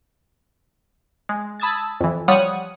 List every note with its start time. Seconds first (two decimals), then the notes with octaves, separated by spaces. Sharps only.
1.29 G#3
1.60 A5 B5 D#6 E6 G#6 A6
2.00 F2 E3
2.28 F3 G3 C#5 F#5 D#6 D#7